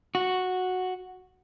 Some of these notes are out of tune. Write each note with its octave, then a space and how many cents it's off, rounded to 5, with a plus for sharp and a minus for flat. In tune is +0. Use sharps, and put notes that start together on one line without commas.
F#4 -5